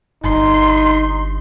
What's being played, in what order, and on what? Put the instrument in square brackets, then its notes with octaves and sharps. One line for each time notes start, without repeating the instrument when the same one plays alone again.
[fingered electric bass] G1 [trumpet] D#4 [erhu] C6